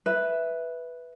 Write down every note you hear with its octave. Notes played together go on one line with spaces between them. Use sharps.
B4 E5